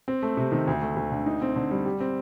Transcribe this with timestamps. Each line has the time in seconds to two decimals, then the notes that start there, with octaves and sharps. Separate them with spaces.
0.08 C4
0.23 A3
0.37 C3
0.52 D#3
0.67 D2
0.82 A3
0.96 D2
1.12 D3
1.26 D#4
1.42 C4
1.56 D3
1.71 G3
1.86 G4
2.00 C4